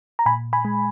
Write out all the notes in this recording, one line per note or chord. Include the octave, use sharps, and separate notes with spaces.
A#5
A#2 G#5 B5
G#5 B5
G#3